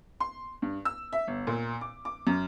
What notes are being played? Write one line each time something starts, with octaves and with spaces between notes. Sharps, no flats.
C6
G2
E6
E5
G1
A#2
D6
D6
F#2